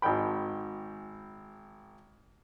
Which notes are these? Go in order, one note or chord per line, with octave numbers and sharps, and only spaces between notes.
G#1 G#3 G5 B5